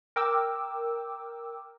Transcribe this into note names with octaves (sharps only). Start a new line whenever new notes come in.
A#4 G5 D6 E6